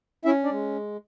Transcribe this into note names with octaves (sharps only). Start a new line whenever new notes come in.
C#4 E4 E5
D4 D5
G#3